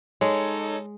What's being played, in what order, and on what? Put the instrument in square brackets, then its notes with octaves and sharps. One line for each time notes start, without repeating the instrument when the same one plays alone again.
[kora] G#3 [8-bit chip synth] D#4 A4 [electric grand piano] C#5